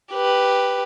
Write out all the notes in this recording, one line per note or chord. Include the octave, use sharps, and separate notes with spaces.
G4 B4